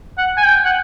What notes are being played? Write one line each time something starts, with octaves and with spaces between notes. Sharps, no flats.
F#5
G#5
G5
F#5